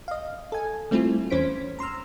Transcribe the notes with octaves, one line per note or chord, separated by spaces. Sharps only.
D#5 F5
A4 G#5
G3 A3 C4 E4 F4
E2 C#4 C5 B6 D7
A#5 C6 E6 F6